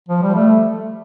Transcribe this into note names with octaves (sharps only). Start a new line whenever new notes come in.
F3
G3
A3